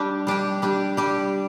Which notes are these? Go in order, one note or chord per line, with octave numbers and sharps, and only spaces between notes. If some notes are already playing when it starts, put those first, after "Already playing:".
Already playing: G3 D4 G4
G3 D4 G4
G3 D4 G4
G3 D4 G4